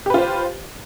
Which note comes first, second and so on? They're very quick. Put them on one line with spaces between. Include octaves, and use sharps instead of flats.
G4 B4 F4 C5